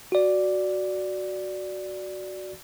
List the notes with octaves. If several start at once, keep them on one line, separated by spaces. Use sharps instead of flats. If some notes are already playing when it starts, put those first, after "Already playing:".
F#4 D5